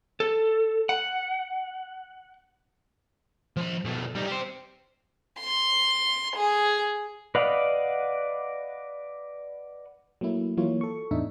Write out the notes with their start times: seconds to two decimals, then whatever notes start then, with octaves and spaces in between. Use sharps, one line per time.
0.20 A4
0.89 F#5
3.57 F3 B5
3.85 B2 A3
4.15 G3 D#4
4.28 G4 C5
5.40 C6
6.36 G#4
7.35 B4 D5 D#5 F5 F#5
10.21 F#3 A3 A#3 E4
10.57 E3 F#3 A#3 E4 F4 C#5
10.81 A4 C#6
11.11 E2 A2 D4 D#4 E5